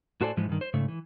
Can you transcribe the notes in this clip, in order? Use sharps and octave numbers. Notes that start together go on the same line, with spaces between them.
A2 F#4 A4 C5 D5 G#5
G#2 E3 F3 G#3
G2 D#3
C5
G#2 C#3 A3
E3